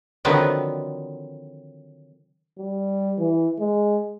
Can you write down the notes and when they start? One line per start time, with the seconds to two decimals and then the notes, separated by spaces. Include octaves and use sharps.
0.25 D3 D#3 F3 F#3 B3 C4
2.59 G3
3.18 E3
3.59 G#3